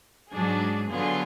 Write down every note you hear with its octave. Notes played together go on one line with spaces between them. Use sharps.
G#2 F#3 D4 G#4
D3 F#3 B3 F4 G#4